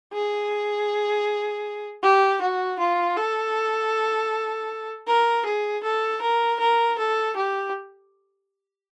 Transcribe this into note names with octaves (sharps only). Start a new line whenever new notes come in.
G#4
G4
F#4
F4
A4
A#4
G#4
A4
A#4
A#4
A4
G4